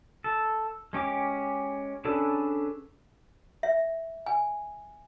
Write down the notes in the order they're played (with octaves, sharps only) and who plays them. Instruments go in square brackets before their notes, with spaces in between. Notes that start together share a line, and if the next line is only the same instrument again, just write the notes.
[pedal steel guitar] A4
G#3 C#4 G4 D6
C#4 D4 G#4 A4 B4
[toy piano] E5
G#5